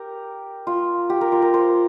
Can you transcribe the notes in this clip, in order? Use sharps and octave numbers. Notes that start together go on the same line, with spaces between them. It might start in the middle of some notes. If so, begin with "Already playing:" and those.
Already playing: G4 A#4
F4
G4
A#4
F4
A#4
C5